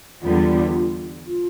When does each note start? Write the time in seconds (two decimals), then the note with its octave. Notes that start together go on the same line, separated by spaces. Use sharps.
0.23 E2 D3 G3 B3 F4
1.27 F4